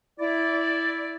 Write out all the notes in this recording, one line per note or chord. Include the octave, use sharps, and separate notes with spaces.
E4 D5